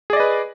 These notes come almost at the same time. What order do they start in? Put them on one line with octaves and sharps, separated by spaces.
G#4 D5 D#5 B4